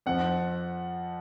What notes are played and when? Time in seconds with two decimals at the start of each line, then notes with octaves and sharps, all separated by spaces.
0.06 F2 F3 F#5